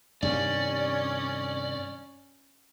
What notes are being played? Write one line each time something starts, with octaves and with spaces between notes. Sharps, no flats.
G2 C3 D#3 C#4 D5